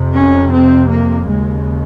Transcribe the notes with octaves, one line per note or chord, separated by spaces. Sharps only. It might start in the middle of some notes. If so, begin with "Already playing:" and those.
Already playing: F2 C3
C#4
C4
A#3
D#2 C#3 G#3